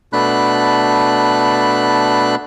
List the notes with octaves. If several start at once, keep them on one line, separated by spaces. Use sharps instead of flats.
B2 A3 D4 B5 F#6